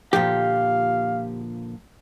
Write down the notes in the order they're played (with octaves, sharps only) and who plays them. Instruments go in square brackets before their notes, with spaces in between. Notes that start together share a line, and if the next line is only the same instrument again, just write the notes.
[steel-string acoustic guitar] A#2 D3 F3 [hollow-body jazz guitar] G4 [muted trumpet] F5